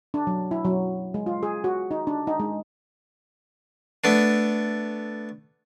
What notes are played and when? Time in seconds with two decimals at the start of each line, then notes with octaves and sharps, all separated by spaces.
0.14 D4
0.27 F#3
0.51 E4
0.65 F#3
1.14 G#3
1.26 F4
1.43 G#4
1.64 F#4
1.91 D#4
2.07 D4
2.27 D#4
2.40 G#3
4.04 A3 B3 D4